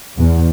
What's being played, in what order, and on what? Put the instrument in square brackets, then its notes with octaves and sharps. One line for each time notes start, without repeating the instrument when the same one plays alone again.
[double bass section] E2